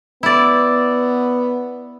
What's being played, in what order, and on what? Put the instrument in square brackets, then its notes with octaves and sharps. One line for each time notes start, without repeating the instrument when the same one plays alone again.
[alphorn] B3 [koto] E4 D5